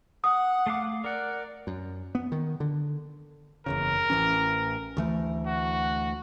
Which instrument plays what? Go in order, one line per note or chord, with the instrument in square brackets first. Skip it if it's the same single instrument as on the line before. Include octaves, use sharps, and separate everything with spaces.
[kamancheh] F#5 [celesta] D#6
[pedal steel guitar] A3 F5 D6
[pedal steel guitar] A#4 F#5 [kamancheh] D5
[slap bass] F#2
B3
D#3
D3
[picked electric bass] F#1 E2 C#3 [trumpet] A#4
[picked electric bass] A1 E3 C#4
D2 E3 A3
[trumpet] F#4